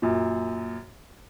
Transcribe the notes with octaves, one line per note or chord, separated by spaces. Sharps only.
F#2 A#2